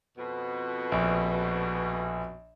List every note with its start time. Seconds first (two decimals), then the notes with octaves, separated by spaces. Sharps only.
0.18 F2 B2
0.92 A#1